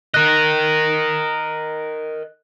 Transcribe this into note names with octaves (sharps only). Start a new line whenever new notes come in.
A#4 D#5 F#6